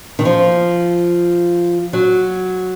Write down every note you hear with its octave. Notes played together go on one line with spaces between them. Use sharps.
D#3
F3
F#3